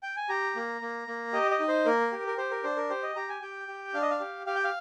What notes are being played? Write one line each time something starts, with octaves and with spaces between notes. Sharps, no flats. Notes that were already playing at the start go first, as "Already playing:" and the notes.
G5
G#5
G4 A#5
A#3
A#3
A#3
G4 D#5
D#5
D#4
C5
A#3 A#4
G4
A#4
G4 C5
A#4
D4 C5
A#4
G4 C5
D#5
G4 A#5
G#5
G4 G5
G4
D4 F5
D#5
F5
G4
G4 F5
G5
F5